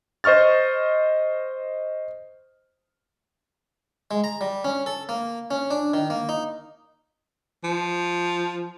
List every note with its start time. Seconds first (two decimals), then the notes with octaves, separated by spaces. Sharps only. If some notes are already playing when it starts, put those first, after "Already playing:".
0.24 C5 D#5 C#6 F6 A6
4.11 G#3
4.24 A#5
4.41 G3
4.64 C#4
4.86 A4
5.09 A#3
5.51 C#4
5.71 D4
5.94 D#3
6.10 A#3
6.29 D#4
7.64 F3